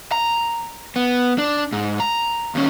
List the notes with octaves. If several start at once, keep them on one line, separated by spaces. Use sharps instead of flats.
A#5
B3
D4
G#2
A#5
D#2 C#4